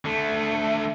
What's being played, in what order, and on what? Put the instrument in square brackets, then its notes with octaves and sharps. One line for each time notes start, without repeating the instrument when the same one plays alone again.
[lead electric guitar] D3 A3